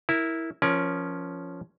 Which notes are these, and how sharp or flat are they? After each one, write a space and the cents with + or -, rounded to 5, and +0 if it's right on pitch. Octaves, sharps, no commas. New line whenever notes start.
E4 -10 A#4 +0
F3 +0 C#4 +0 A#4 +30